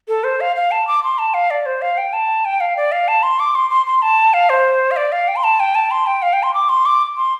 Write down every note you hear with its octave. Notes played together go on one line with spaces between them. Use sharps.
A4
C5
F5
F5
A5
D6
C6
A5
F5
D5
C5
F5
G5
A5
G5
F5
D5
F5
A5
C6
D6
C6
C6
C6
A5
F5
C5
F5
D5
F5
G5
C6
A5
G5
A5
C6
G5
F5
G5
C6
D6
C6
D6
C6